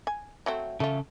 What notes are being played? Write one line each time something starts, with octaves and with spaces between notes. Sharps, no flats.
G#5
F#3 A3 C4
C#3 A3 F4 A4